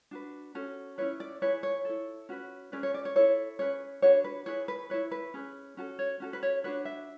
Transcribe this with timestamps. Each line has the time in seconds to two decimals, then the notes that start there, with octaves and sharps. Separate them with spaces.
0.11 D4 F#4 B4
0.55 C#4 F#4 A4
0.98 C#4 E4 B4 C#5
1.20 D5
1.42 E4 G#4 B4 C#5
1.63 C#5
1.85 E4 A4
2.29 C#4 F#4 B4
2.72 C#4 G#4 B4 D5
2.83 C#5
2.94 D5
3.05 C#5
3.16 E4 A4 C#5
3.59 C#4 G#4 B4 C#5
4.02 D4 F#4 B4 C#5
4.24 B4
4.46 E4 G#4 B4 C#5
4.68 B4
4.90 E4 B4 C#5
5.11 B4
5.34 C#4 G#4 B4
5.77 C#4 F#4 A4
5.99 C#5
6.20 C#4 F#4 A4
6.33 B4
6.43 C#5
6.64 D4 F#4 B4 C#5
6.85 E5